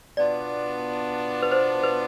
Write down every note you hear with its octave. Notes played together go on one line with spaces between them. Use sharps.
B2 B3 D4 F4 D5
B4
C5
B4